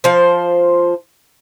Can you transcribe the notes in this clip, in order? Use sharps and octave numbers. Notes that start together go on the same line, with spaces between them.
F3 C5